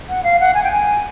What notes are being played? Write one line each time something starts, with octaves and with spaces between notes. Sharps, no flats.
F#5
F5
F#5
G#5
G5
G#5